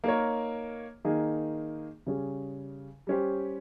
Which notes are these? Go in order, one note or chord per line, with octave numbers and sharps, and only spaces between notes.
A#3 D#4 A#4 C#5
D#3 A#3 D#4 G#4
C#3 G3 C#4 G#4
G3 C#4 G4 C5